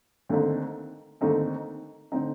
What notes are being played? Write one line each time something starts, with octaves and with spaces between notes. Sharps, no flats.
D#2 D3 A3 C4 D#4
D#2 D3 A3 C4 D#4
D3 A3 C4 D#4